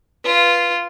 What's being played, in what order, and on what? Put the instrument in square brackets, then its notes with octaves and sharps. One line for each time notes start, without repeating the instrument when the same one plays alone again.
[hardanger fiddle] F4 [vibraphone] B4